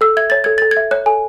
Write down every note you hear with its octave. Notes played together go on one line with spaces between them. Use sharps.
A4 E6
E5 G#6
C#5 A6
A4 G#6
A4 A6
G#6
E5
C#5 F#6
A4 G#5